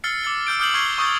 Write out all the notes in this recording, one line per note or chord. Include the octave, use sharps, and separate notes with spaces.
E6 F6 A6 C7 C#7
D6 E6 A6 C#7
E6 F6 G6 D7
D6 D#6 F6 G6 C7 F#7
C#6 F6 G6 G#6 C7 G7
C#6 D#6 E6 G6 A6